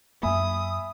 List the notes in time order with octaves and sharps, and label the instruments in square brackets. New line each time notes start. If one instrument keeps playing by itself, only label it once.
[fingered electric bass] F#2 A#3 [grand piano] E5 G#5 B5 [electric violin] D#6